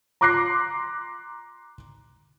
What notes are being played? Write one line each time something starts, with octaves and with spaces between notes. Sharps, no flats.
A#5 C6 D6 F#6 A#6 C7